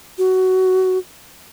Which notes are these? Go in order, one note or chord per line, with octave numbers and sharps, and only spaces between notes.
F#4